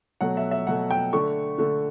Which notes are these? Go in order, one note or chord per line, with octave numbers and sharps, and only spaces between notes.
B2 F#3 A3 F#5
E5
E5
B2 F#3 A3 F#5
G5
D3 A3 C#6
D3 A3